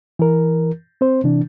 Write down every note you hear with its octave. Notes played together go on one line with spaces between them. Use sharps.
E3 A#4
C4 C5
C3 E3 D4